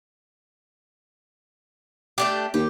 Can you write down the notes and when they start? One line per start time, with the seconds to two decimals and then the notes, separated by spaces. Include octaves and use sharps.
2.18 A3 D4 G4
2.54 D#2 G4